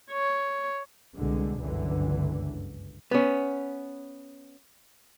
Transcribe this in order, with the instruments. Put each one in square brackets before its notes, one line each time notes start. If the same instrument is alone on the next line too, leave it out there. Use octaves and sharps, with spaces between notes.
[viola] C#5
[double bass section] C2 B2 D3 G#3
G1 C#2 F#2 D3 E3
[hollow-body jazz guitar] B3 C#4